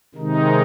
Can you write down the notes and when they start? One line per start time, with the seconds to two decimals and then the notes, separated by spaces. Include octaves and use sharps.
0.15 C3 D#3 G#3 D#4